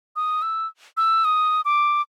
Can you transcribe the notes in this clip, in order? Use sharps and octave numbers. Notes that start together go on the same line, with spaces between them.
D#6
E6
E6
D#6
D6